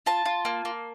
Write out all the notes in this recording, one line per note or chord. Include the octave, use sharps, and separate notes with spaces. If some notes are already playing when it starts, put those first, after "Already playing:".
F4 A5
F4
A#3
A#3